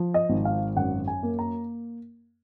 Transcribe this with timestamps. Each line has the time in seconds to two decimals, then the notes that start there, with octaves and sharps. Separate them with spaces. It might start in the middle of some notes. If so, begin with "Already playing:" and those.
Already playing: F3
0.14 D#5
0.29 G#1
0.45 F5
0.76 F#2 F#5
1.08 G#5
1.23 A#3
1.39 A#5